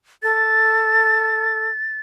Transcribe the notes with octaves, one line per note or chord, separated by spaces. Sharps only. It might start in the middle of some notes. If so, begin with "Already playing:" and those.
A4 A6